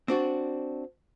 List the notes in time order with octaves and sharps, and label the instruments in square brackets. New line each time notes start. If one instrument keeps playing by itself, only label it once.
[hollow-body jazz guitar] C4 D4 F#4